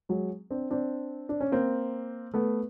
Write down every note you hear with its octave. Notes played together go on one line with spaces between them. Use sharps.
F#3 G#3
C4 D4
C4 D4
D4
C#4
A#3 C4
A3 B3